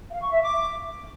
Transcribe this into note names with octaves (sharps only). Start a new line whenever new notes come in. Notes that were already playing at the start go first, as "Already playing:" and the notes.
F5
C#6
E5
D6